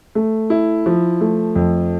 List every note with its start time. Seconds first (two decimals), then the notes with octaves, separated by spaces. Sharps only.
0.15 A3
0.50 E4
0.86 F3
1.21 A3
1.56 F2